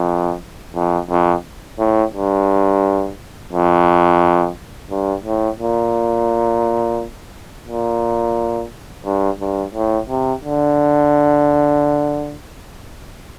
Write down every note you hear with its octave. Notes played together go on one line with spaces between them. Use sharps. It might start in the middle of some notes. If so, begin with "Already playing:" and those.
Already playing: F2
F2
F2
A2
G2
F2
G2
A2
A#2
A#2
G2
G2
A2
C3
D3